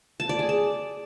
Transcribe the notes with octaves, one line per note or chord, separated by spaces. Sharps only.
A5
D5
G#4
A5